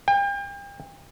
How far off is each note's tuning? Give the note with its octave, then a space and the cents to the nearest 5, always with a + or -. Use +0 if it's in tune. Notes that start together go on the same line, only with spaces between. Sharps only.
G5 +40